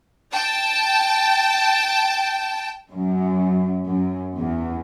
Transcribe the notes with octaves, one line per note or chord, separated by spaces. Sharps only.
G5 A5
F#2
F#2
E2